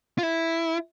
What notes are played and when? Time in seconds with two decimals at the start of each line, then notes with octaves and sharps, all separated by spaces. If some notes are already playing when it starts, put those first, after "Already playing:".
0.18 F4
0.23 E4